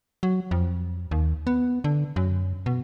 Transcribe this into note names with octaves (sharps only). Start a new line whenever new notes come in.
F#3
F2
D#2
B3
D3
F#2
B2